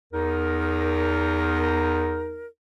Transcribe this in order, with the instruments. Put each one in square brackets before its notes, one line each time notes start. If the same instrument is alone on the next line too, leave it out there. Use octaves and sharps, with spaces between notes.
[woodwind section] E2 D#4 A#4